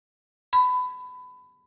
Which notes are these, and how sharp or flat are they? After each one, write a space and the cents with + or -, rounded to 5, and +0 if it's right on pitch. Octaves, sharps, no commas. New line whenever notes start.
B5 +25